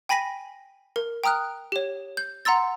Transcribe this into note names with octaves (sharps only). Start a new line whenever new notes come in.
G5 G#5 B5 A#6 B6 D#7
A#4
G5 A#5 D#6 F6 F#6
G4 C#5
G6
F#5 A#5 C6 E6 A6